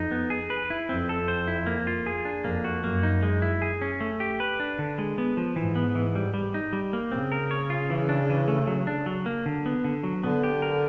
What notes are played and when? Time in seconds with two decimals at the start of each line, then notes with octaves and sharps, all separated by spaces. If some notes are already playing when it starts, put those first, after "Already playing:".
Already playing: F2 D#4
0.11 B3
0.30 G#4
0.50 B4
0.70 E4
0.89 F2 C4
1.09 A4
1.28 C5
1.48 E4
1.66 A#3
1.87 F4
2.06 G#4
2.25 D4
2.44 F2 A#3
2.64 F#4
2.84 F#2 A#3
3.03 D#4
3.23 G#3
3.42 E4
3.62 G#4
3.82 C#4
4.00 A3
4.20 G4
4.40 B4
4.60 D4
4.79 D3
4.98 G#3
5.18 B3
5.37 F3
5.56 G#2 E3
5.76 B3
5.95 E3
6.15 G3
6.34 G3
6.54 D#4
6.73 G3
6.93 A#3
7.12 C#3 C4
7.32 A#4
7.51 C#5
7.70 F4
7.90 E3
8.09 D4
8.30 E3
8.48 A3
8.67 F#3
8.87 D4
9.06 F#3
9.26 A#3
9.46 D3
9.66 B3
9.84 D3
10.03 F#3
10.23 D3 B3
10.43 G4
10.62 A#4